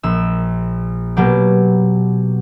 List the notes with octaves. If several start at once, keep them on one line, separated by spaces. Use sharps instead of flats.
A#1 E6
B2 F#3 A#3 G4